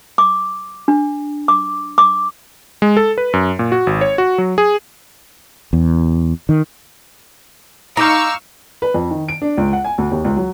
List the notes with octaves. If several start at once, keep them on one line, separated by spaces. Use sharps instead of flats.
D6
D4
D6
D6
G#3
A4
B4
F#2
A#2
F#4
G#1
C#5
F#4
F#3
G#4
E2
D#3
D#4 F5 A#5 C#6 D6 E6 G6
B4
F2
D#3
D7
D4
C#2
F#5
G#5
D2
D#2
C#2
F#3